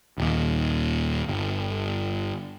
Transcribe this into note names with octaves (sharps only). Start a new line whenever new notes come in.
D#1 D#2
G1